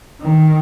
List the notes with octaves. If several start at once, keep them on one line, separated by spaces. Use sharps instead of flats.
D#3